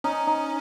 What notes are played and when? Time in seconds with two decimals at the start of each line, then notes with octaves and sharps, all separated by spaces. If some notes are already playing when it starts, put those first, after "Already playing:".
0.04 C#4 D#4
0.27 D#4